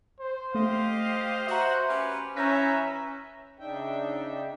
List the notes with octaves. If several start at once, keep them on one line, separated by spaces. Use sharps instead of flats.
C5
A3 G4 D#5 F5
F#4 E5 A#5
C#4 G4 B4
E3 C#4 B4 E5 A#5 G6 A#6
C#3 D4 D#4 E5 G5